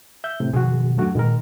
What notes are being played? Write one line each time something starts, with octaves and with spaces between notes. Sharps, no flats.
E5 G6
A2 C3
B2 D#3 F3 F#4 G#4
F#2 F#3 A3 D4 F#4
A#2 D#3 G#3 A#4